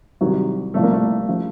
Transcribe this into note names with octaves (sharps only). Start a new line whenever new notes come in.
C2 C3 D#3 F#3
C2 A#2 F3 A3
A#3
A3
C#3 F3